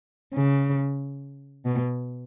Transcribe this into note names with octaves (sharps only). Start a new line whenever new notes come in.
C#3
B2